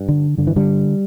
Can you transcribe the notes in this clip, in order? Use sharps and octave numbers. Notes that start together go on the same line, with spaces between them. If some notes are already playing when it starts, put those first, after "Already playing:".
Already playing: G2
D3
G2 D3
E3
D3 G3